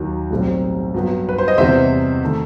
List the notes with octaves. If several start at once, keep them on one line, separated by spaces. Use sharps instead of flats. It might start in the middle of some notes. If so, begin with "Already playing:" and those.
Already playing: D#2 D#3 F#3
B1 A2 G3 C4
G2 F#3 B3
B4
C5
D#5
E2 C3 E3 G3 C5 E5
D#3 A3